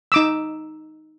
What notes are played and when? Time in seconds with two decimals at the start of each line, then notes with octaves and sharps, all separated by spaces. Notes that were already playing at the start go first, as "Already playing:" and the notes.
0.12 D#4 D6 E6